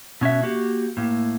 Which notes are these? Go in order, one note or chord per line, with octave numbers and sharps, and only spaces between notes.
B2 C#4 F#4 E5
A#3 F#4 G4
A2 A#3